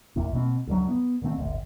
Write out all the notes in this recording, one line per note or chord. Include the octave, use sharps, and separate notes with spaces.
A#1 E2 A#2
B2 A#3 C4
D2 G2 F#3
B3
A#2 D#3 A3 C4
D1 G1 D3